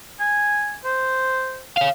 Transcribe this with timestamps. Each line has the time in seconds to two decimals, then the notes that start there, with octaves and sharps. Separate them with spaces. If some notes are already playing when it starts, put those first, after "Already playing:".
0.20 G#5
0.85 C5
1.77 C#5 F5